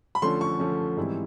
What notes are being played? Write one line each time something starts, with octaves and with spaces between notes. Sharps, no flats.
B5
D3 F3 A3 C#4 C6
C#6
D3 F3 A3 C#4
G#2 E3 G3 C4 E4